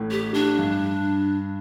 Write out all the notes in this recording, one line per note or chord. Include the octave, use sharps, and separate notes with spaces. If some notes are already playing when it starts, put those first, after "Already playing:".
Already playing: A1 A2
G4
D4
G2